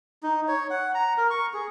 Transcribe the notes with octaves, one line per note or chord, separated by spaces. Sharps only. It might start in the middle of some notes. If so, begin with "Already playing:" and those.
D#4
C#5
F#5
A#5
A#4
C#6
G#4